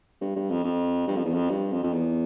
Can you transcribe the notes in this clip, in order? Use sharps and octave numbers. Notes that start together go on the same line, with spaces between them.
G2
G2
F2
F2
G2
F2
E2
F2
G2
F2
F2
E2